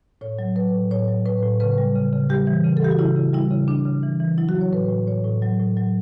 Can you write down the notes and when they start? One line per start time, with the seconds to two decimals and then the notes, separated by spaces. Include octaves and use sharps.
0.21 A2 C#5
0.39 F#3
0.56 F#3 B4
0.74 A2
0.91 A2 C#5
1.08 F#3
1.26 A2 B4
1.43 A2
1.60 C#3 B4
1.78 G3
1.95 C#3
2.13 C#3
2.30 G3 G4
2.47 E3
2.64 C#3
2.77 A4
2.82 E3 G4
2.91 F#4
2.99 C#3 E4
3.16 C#3
3.33 G3 E4
3.51 C#3
3.68 C#3 D4
3.86 C#3
4.03 E3
4.20 E3
4.38 F#3 E4
4.49 F#4
4.55 F#3
4.61 C#5
4.72 A2 B4
4.89 A2
5.07 A2 C#5
5.24 A2
5.42 F#3
5.59 A2
5.77 F#3